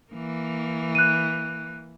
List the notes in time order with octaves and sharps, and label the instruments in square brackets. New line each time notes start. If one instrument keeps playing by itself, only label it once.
[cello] E3 A#3
[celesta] F#6 D#7